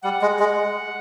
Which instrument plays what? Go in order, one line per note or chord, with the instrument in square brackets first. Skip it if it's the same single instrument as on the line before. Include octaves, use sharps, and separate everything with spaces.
[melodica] G3 [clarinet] F#5
[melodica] G#3
G#3